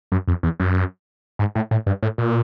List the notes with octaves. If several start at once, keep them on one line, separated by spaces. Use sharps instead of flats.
F#2
F2
E2
F#2
G#2
A2
A2
G2
A2
A#2